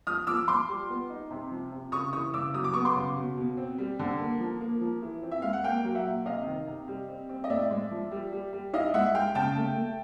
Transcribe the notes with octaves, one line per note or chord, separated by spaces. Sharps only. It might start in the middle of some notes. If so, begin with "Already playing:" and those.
F3 D#6 F6
F3 D6 E6
F3 C6 D6
G3
B3
D#4
C3
F3
C3
C#3 C#6 D#6
E3 C#6 D#6
C#3 D6 E6
F#3 D#6
D6
B3 C#6 D#6
C6 D6
C#3
B2
B2
C4
G3
D3
A#3
F3
A#3
F3
E3
C4
E5
G#3 F5
F#5
A#3 F5 G5
F#3
E5 F#5
A#2
C3 D#5 F5
D#3
C3
G3
C4
C4
D#5
A2 D5 E5
G#3
F3
G3
G3
G3
E4 D#5 F5
G#3 E5 F#5
G#3 F5 G5
C#3 G5 A5
A3
A3